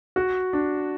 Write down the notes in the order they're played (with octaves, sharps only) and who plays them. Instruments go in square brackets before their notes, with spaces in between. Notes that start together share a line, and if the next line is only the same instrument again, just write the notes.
[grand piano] F#4
D4